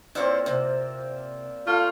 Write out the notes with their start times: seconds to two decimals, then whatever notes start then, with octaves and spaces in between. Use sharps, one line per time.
0.15 A#2 A#3 C4 E4 C5 C#5
0.46 C3
1.67 A3 F4 F5